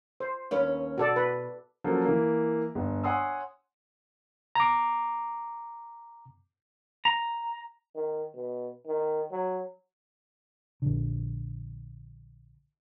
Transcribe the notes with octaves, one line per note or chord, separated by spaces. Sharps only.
C5
D#2 C#4 B4
B2 F#4 A4 D5
B4
F3 F#3 A#3 C#4 F#4 A4
E3 A#3
G1
C#5 F#5 G#5 C6 D#6 E6
A#5 D6
A#5
D#3
B2
D#3
F#3
A#1 D3